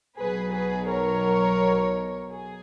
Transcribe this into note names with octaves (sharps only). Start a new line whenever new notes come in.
B1 B2 F#3 G#4 B4
G#4 B4
A#4 C#5
G#4